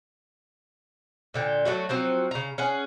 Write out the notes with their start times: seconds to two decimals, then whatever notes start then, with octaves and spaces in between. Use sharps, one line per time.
1.34 A#2 D3 G5
1.65 F#3 G#3 A3 F#4
1.89 F3 F#3 C4 F#4
2.31 C#3 A#5
2.58 C#4 G#4 F#5